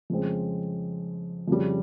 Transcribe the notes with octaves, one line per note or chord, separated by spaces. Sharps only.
F2 C#3 G#3 C4
F2 C#3 G3